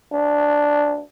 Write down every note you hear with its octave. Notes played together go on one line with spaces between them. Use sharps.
D4